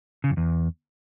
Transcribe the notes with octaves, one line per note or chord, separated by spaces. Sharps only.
C#3
F2
E2